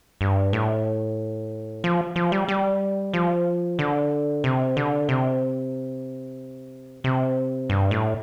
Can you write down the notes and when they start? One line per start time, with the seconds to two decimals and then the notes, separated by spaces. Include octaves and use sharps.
0.21 G2
0.53 A2
1.84 F3
2.16 F3
2.32 G3
2.48 G3
3.14 F3
3.79 D3
4.44 C3
4.77 D3
5.09 C3
7.04 C3
7.70 G2
7.91 A2